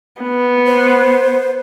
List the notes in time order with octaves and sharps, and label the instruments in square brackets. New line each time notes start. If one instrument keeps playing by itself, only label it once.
[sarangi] B3
[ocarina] C5